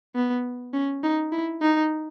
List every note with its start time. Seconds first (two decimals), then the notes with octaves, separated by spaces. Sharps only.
0.15 B3
0.73 C#4
1.03 D#4
1.32 E4
1.62 D#4